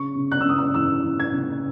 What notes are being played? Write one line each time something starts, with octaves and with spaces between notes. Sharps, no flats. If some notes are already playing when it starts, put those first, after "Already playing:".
Already playing: C#3 C#6
C#3
F#6
E6
C#3 D#6
E6
E3 E6
E3
G#6
C#3